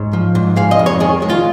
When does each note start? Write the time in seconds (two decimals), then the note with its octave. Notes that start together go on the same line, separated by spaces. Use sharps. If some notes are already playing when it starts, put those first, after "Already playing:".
Already playing: G#2 C#5
0.13 F3
0.35 G#2
0.56 G#3 F5
0.71 D#5
0.79 F2
0.86 C#5
1.00 D#3 G#4
1.22 G#3
1.30 F4